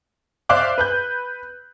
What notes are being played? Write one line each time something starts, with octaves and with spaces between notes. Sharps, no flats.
C5 D5 E5 F5 D6 F#6
B4 F#6 G6